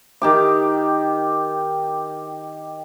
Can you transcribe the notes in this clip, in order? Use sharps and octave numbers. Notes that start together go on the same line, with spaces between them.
D#3 G4 D6